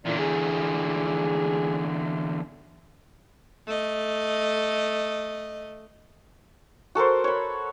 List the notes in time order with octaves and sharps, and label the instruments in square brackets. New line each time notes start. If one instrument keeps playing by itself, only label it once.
[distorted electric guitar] E2 D3 [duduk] A#2
[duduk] G#4
[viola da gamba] A3 D#5
[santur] F#4 A4 A#4 C5
C#5 B5